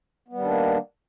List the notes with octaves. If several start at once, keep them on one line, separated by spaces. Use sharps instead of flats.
D#3 G3 A#3 B3 D4